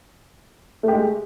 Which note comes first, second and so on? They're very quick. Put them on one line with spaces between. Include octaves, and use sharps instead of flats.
A3 G4 G#3